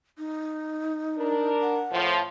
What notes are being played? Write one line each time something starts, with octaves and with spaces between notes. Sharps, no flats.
D#4
D4 A#4
F#5
A2 F3